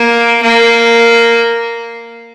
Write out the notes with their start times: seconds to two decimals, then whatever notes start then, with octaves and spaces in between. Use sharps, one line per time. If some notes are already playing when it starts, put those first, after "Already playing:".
Already playing: A#3
0.43 A#3